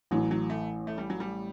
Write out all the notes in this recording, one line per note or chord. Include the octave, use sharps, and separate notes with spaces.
A1 A2 E3 F#3
F#3
A3
A3
G3
F#3
G3